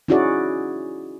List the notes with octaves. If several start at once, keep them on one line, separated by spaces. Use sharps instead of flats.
C#4 D#4 E4 F#4 G#4 D5